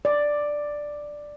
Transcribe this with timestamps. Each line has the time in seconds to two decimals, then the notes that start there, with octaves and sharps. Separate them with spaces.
0.05 D5